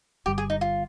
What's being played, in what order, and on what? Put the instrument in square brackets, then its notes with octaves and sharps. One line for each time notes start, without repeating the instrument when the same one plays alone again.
[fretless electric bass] G1 G2 G3 [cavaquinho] G4
[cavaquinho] G#4
D#4
F4